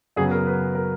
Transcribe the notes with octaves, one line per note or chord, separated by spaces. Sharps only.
F#2 C#3 F#3 B3 G#4
A#4
B4
A#4